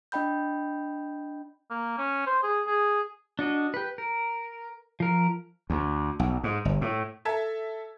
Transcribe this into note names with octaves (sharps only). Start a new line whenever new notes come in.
D4 D#5 G5 B5 G6
A#3
C#4
C5
G#4
G#4
D4 F#4 D#5
G4 B4
A#4
F3 A#4
D2
B1
G#2
G1
A2
A4 E5 A5 G#6